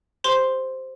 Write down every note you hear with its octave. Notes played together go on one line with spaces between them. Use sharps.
G4 C5 C6